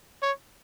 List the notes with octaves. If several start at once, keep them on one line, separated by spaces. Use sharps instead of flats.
C#5